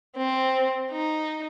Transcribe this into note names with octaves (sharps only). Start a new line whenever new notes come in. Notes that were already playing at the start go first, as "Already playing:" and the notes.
C4
D#4